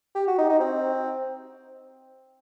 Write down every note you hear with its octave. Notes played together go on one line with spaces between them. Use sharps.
G4
F#4
D#4
D#4
C4